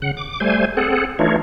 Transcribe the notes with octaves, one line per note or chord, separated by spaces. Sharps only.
C#3 F#5
D6
G3 A3 C5 G#5
C4 G#4 A4 F#5
E3 A3 D4 D#4 F4 C#5